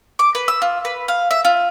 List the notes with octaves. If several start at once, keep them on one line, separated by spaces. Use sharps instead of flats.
D6
B4
E6
F4
B4
F5
E5
F4